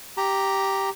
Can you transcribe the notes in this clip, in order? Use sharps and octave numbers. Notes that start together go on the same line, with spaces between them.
G4 A#5